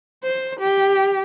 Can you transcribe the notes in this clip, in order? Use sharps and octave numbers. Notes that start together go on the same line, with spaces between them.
C5
G4